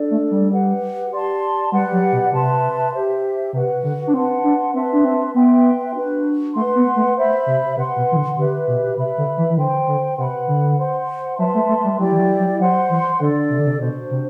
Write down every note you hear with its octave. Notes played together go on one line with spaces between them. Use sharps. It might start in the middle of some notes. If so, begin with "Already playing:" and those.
Already playing: D4 A4 D5
A3
G3
G4 B4 F#5
G4 D5 A5 C6
G3 G4 B4 D5 F#5
F#3
B2
C3 B4 E5 A5 C6
G4 C5 E5
C3 F#4 B4 F#5
D3
D4
C4 B4 F#5 A5 C6
D4
C4 B4 E5 A5 C6
D4
C4
B3 B4 E5 G5 C6
D4 F#4 B4
A3 B4 F#5 C6
B3
A3
C5 E5 B5
C3
C3 B4 F#5 C6
B2
E3
D3
D3 G4 B4 E5
B2
C3 B4 E5 B5
D3
E3
E3
D3 C5 G5 C6
D3
C3 B4 F#5 B5
D3
C5 F#5 C6
F#3 B4 E5 A5 C6
A3
A3
G3
F#3 E4 G4 D5 G5
E3
F#3
F#3
F#3 C5 F#5 C6
E3
D3 D4 A4 D5
C3
D3
C3
B2 D4 F#4 C5
C3